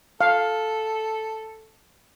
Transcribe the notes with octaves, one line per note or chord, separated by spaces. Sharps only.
A4 F5